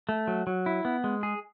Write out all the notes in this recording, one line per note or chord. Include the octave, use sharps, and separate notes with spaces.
A3
F#3
F#3
E4
B3
G#3
G#4